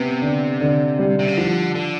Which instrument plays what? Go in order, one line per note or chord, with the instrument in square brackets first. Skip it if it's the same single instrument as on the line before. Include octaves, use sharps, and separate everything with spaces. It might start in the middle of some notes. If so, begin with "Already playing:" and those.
Already playing: [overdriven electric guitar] C3 [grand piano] B3
[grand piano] D3
D3
G3
[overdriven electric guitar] C3
C#3
[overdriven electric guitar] D3 [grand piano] F3
[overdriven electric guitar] D3